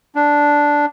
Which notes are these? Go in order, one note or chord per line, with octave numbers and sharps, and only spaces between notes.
D4